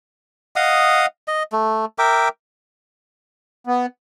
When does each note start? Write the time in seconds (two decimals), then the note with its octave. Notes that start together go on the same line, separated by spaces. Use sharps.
0.56 D#5 F5 F#5 D#6
1.28 D#5
1.52 A3
1.98 A#4 E5 G5 D6
3.67 B3